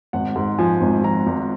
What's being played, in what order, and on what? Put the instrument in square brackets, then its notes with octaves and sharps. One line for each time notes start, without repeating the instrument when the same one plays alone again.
[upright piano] G#1 F#5
G#2
F3 G#5
G#1
F3 A#5
G#1